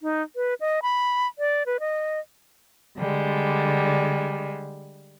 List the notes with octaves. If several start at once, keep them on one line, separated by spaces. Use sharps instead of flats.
D#4
B4
D#5
B5
D5
B4
D#5
D3 G3 G#3